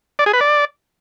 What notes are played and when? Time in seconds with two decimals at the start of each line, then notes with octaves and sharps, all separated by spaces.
0.19 D5
0.26 G#4
0.33 B4
0.41 D5